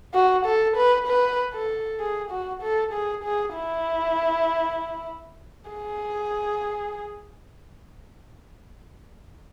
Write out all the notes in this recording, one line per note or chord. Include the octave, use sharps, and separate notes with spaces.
F#4
A4
B4
B4
A4
G#4
F#4
A4
G#4
G#4
E4
G#4